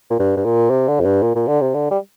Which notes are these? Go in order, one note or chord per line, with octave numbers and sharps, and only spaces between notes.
A#2
G2
G2
A#2
C3
D3
F2
G2
A#2
A#2
D3
C3
D3
G3